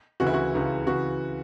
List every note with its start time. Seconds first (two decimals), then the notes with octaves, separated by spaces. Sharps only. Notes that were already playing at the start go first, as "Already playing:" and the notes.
0.20 D2 C#3 E3 F#4
0.27 E4
0.34 F#4
0.54 C#2 C#3 E3
0.87 C#3 E3 F#4